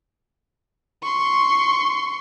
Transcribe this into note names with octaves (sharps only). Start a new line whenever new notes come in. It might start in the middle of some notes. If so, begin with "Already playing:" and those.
C6 C#6